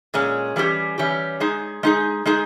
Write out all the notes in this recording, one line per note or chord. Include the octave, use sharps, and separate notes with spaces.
A#2 G#3 C#4
E3 G3 C#4 G4
E3 G3 C#4 G4
G#3 D#4 G#4
G#3 D#4 G#4
G#3 D#4 G#4